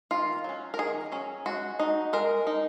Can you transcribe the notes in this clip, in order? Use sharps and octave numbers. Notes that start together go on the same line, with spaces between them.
D#3 F4
F#3 C#4
A#4
D#3 G#4
F#3 C#4
G#3 F#4
D#4
G#3 A#4
D#4